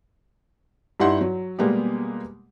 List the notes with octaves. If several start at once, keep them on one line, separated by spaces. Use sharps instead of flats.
G2 D#4 E4 G4 F#5 C6
F#3
B2 G3 G#3 A#3 B3 G4